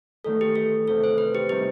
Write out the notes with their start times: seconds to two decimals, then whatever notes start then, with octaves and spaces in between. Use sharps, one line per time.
0.24 E2 D#3 A3 D#4 A4
0.41 G4
0.56 A4
0.88 E2 C3 D#3 A4
1.04 C5
1.18 B4
1.35 G4
1.49 C3 D#3 G3 C4 D#4 G4